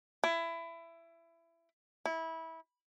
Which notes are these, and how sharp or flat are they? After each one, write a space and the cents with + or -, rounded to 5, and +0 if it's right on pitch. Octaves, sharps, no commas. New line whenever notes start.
E4 +20
E4 -20